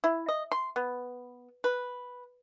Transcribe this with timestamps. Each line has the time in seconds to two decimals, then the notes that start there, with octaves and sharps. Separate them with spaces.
0.04 E4
0.29 D#5
0.52 C6
0.76 B3
1.64 B4